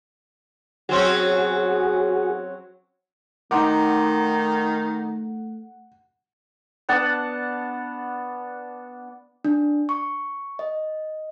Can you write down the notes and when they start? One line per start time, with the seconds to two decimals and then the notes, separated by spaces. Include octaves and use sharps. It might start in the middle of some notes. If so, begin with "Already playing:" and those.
0.89 F#3 C4 C#4 F#4 G#4
3.51 D#3 A3 D#4 F#5 C6 D6
6.89 B3 D4 F#5 A5
9.45 D4
9.89 C#6
10.59 D#5